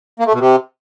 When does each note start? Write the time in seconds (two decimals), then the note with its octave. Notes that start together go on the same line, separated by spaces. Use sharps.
0.19 A#3
0.26 A3
0.33 B2
0.40 C3